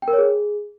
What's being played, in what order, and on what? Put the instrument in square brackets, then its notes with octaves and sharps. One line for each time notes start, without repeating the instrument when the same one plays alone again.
[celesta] G5
A#4
C#5
G#4